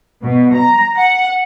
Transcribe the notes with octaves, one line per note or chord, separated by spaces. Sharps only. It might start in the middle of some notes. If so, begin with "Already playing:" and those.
B2
A#5
F#5